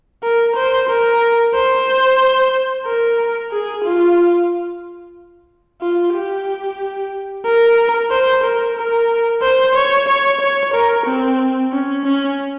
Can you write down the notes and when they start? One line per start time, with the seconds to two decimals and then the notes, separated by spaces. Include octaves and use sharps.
0.23 A#4
0.56 C5
0.89 A#4
1.55 C5
2.86 A#4
3.52 G#4
3.84 F4
5.81 F4
6.14 G4
7.45 A#4
8.11 C5
8.44 A#4
8.77 A#4
9.42 C5
9.75 C#5
10.08 C#5
10.40 C#5
10.74 A#4
11.06 C4
11.72 C#4
12.05 C#4